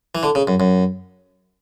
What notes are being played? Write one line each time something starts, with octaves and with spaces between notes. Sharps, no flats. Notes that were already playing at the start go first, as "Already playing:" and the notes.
E3
D3
C#3
F#2
F#2